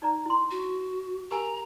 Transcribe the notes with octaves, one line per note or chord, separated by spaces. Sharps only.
D#4 D5 A#5
E4 C6
F#4
G4 A#4 G#5 A#5